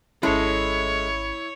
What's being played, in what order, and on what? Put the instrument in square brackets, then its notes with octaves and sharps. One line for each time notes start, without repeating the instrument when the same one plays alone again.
[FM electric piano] G#1 C#4 [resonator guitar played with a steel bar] G#3 A4 [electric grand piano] E4 [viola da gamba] C#5